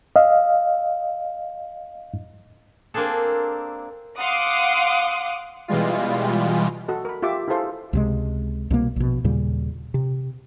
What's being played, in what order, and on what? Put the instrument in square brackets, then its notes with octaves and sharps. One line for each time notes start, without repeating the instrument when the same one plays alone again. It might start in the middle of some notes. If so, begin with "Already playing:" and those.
[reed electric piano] D#5 F5
[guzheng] A#3 C4 D4 G#4 A4
[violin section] F5 F#5 C6 D6 D#6
[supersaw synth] B2 E3 G3 G#3 F4
[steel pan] F#4 A4 D#5
A#4 B5
F4 G4 E5 D6
E4 F#4 G#4 A4 C5 F5
[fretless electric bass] C#2 C3 G#3
C2 B2 A#3
A#1 B2
D#2 A#2 C#3 G3
C3